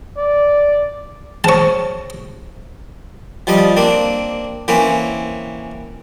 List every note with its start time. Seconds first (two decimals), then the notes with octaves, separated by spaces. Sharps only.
0.17 D5
1.44 G#4 C5 C#5 A5 C#6
3.47 F3 G3 D#5 D#6
3.77 A#3 C4 D4
4.68 E3 A#3 C4 C#4